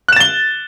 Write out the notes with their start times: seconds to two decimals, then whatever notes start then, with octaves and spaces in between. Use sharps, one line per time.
0.08 F#6
0.12 E7
0.16 A6
0.20 G7